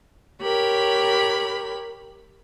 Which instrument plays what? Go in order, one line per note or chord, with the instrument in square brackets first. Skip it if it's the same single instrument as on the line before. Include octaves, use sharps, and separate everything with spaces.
[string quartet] G4 A#4 C#5 B5